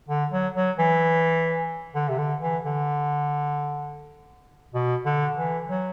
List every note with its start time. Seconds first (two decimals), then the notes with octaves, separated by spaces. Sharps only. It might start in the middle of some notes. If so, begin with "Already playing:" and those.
0.09 D3
0.32 F#3
0.56 F#3
0.79 E3
1.95 D3
2.09 C3
2.18 D3
2.42 E3
2.65 D3
4.74 B2
5.05 D3
5.37 E3
5.67 F#3